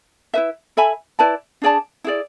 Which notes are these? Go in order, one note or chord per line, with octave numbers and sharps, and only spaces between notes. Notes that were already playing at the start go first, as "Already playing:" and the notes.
E4 B4 E5
A4 E5 G#5 B5
E4 B4 D5 A5
D4 G#4 D5 A5
E4 G#4 D5